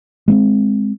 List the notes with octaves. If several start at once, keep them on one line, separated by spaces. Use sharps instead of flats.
G#3 A#3 C4